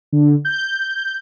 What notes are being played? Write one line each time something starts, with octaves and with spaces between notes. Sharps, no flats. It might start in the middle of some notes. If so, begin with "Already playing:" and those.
D3
G6